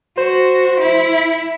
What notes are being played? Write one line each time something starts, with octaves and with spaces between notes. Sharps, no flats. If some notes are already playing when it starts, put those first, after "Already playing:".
F#4 C5
E4